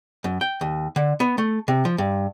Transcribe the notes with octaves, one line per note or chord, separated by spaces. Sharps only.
F#2
G5
D#2
D3
B3
A3
C3
F3
G2